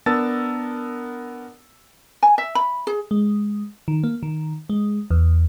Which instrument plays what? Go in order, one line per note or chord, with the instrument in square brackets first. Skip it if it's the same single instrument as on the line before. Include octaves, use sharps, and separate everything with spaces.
[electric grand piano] B3 D4 A#4 A5 E6 A6
[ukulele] G#5
E5
B5
G#4
[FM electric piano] G#3
D#3
A#3
D#3
G#3
E2